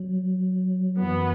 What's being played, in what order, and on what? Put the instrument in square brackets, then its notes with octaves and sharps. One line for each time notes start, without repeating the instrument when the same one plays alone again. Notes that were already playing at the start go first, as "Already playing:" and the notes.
Already playing: [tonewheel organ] F#3
[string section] F#2 E3 B3